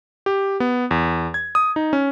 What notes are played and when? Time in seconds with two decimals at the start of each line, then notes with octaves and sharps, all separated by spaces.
0.26 G4
0.60 B3
0.91 E2
1.34 G#6
1.55 D#6
1.76 D#4
1.93 C#4